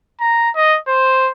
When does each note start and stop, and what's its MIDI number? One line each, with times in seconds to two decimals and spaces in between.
0.21 0.50 82
0.55 0.78 75
0.88 1.31 72